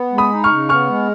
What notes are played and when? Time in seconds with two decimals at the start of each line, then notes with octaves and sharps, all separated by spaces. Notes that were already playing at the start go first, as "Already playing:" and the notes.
Already playing: B3
0.13 G#3
0.18 B5 D#6
0.31 D#4
0.44 C#6 F6
0.51 C#3
0.69 B3 C#6 F6
0.89 G#3